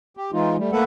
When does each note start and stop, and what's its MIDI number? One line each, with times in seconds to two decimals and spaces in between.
0.17 0.31 67
0.33 0.56 52
0.33 0.56 56
0.33 0.56 63
0.33 0.56 65
0.58 0.71 55
0.58 0.71 57
0.72 0.84 57
0.72 0.84 58
0.72 0.84 69
0.72 0.84 71
0.72 0.84 76
0.72 0.84 78